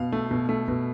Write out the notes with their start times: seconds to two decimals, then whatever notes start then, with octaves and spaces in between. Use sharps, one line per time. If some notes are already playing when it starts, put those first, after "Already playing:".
Already playing: B2 F5
0.12 A3
0.31 B2
0.49 A3
0.68 B2